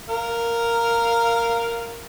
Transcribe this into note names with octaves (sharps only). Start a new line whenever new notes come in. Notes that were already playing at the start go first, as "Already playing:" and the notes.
A#4 F5